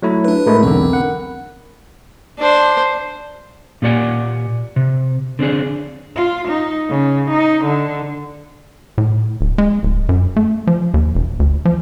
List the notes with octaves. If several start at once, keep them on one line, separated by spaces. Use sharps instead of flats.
F#3 A3 E4
D4 B4
A2 G#3 A3 A#4 B5
B1 E2 D3 C4
F#5
D4 C5
A#2 A#3 G4 D5 F#5 G#5
C3
D3 C4 D4 G#4
F4
D#4
C#3
D#4
D3
A2
D1
G#3
D1
F#2
A3
F3
D#2
E1
D2
F3